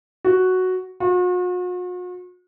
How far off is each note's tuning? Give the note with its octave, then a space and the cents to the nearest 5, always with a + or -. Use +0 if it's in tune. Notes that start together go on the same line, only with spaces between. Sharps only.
F#4 +0
F#4 -45